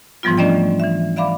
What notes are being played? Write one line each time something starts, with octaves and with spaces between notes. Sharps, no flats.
G#2 E3 F3 G3 B3 F4
A3 C#4 D4 D5 D#5 G5
E3 E5
D5 E5 F5 B5 D6